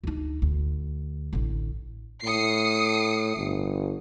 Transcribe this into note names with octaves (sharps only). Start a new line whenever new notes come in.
D2 D#4
D2
A1 D3
A2 D#6 C7 C#7
G1